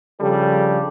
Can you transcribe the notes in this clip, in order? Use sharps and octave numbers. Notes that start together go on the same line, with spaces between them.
C#3 F3 G3 D4 G4 A4